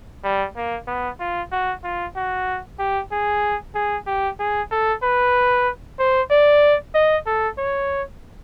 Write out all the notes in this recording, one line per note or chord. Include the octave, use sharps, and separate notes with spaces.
G3
A#3
B3
F4
F#4
F4
F#4
G4
G#4
G#4
G4
G#4
A4
B4
C5
D5
D#5
A4
C#5